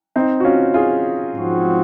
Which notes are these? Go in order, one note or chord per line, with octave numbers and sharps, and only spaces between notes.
C4 D#4
F#4
C#4 F4
F4 G#4
G#2 F3 C4 F#4